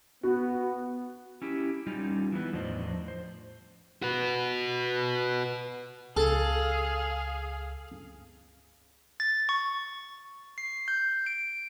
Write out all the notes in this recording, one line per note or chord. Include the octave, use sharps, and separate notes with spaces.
B3 F#4
C#4 E4 G4
G3 C#4 D#4 F4
E3 B3
E2 A2 F3 D4 C5 D#5
C5
F#4 B4
C#2 G#4 A4 F5
A6
C#6
C7
G6
D7